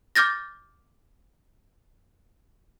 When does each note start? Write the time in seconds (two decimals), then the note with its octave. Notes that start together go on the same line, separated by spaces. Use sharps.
0.16 D6 F6 G6 A6 A#6